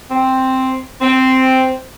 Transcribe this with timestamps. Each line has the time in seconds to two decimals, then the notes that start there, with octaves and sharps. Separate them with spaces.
0.10 C4
1.01 C4